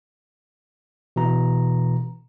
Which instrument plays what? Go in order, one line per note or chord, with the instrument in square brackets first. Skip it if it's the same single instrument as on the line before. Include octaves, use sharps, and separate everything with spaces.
[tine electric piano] B2 E3 A#5